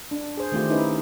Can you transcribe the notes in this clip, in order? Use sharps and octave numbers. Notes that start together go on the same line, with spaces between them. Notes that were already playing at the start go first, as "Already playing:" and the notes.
D4
G#4 C5
D#3 A3 C4 F4 G4
C#4 D#4 E4 B4